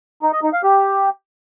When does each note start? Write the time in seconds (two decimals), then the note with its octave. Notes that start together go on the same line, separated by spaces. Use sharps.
0.23 D#4
0.33 D#5
0.43 D#4
0.53 F5
0.63 G4